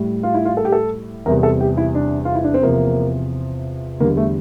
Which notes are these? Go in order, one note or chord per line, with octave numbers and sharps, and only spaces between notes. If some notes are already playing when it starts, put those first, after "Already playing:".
Already playing: A2 G3
F4
E4
F4
A4
G4
A4
E2 C3 G3 A#4
A4
G4
E4
D4
F4
E4
D4
C4
E2 C3 F3 A#3
E2 D3 G3 A#3
A3